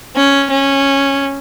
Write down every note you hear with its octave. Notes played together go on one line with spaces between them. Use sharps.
C#4
C#4